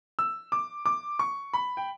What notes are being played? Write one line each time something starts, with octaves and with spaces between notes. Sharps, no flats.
E6
D6
D6
C#6
B5
G5